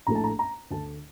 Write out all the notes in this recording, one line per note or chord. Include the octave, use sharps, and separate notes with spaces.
A#1 A2 A3 A#5
A5
A#5
A#5
D2 D3 A3 A5